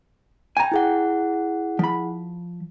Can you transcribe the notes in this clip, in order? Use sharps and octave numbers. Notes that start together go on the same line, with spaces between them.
G5 G#5 A#5
E4 G#4 F#5
F3 B5